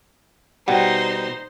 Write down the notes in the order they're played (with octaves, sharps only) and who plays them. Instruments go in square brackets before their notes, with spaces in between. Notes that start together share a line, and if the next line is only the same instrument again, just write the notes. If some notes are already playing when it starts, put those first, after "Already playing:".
[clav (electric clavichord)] B2 G3 [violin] D#4 C5 [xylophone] F#5 G5